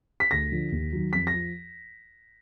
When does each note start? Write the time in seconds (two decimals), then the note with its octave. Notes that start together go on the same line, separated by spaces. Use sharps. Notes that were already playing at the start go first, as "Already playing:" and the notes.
0.20 B6
0.31 D2 A#6
0.52 D3 F3
0.72 D#2
0.92 D#3 F#3
1.13 F2 B6
1.27 A#6
1.33 F3